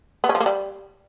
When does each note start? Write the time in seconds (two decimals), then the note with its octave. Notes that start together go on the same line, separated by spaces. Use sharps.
0.24 B3
0.29 C#4
0.35 F3
0.40 A#3
0.46 G3